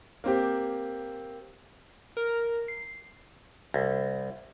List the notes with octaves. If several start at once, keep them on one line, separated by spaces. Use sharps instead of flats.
A#3 C4 G4
A#4
C7
C2